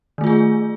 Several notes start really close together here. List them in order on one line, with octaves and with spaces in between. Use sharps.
D#3 A3 F4 G#4